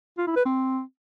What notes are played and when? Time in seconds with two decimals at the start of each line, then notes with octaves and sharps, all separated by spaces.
0.18 F4
0.27 E4
0.36 B4
0.45 C4